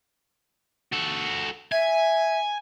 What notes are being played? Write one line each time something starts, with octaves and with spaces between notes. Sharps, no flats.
F#4 A4
E5 G#5